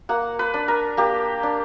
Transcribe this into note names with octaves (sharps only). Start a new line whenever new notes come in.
A#3 F#5
B4
D4
A#4
A#3 G4
D4